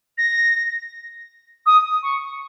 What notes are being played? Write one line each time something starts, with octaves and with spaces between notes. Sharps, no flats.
A#6
D#6
C#6